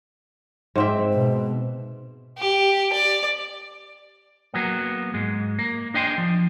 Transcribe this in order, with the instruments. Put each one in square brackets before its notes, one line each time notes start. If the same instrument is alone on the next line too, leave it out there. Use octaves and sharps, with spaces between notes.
[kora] G#2 C4 E5
[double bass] B2
[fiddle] G4
D5
[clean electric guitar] F#3 A#3 B3
G#2 G#3
A#3
D4 D#5 G5 G#5 C6
F3